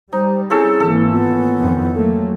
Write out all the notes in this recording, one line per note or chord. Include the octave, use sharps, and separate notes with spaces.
G3 D#4 C5
C4 C#4 E4 G#4 A4
G#1 E3 A#3 A4
B3 F4
F2 D#3 E3
F#3 A3 A#3 A4